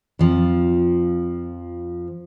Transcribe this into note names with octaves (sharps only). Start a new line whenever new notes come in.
F2 F3